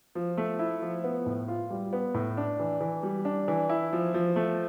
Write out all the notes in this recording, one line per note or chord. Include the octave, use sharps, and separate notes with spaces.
F3
A3
E4
F3
B3
A2
F4
G3
B3
A2
D4
E3
E3
G3
D4
E3
E4
F3
F3
A3